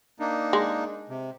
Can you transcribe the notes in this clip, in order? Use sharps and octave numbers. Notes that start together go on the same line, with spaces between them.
A#3 D4 D#4
G#3
C3